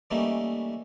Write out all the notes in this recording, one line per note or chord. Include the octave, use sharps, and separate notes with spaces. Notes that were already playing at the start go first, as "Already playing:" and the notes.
E3 G3 A3 A#3 C#4 D#4